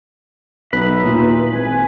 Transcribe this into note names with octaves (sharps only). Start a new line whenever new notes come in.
B1 D#4 B4 E5
D#2 A#2 E4 F4
G#1 G#5